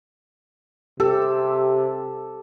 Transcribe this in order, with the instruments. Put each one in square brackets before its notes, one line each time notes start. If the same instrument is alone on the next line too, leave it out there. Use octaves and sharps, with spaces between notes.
[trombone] C3 [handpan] G4 [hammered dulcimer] A4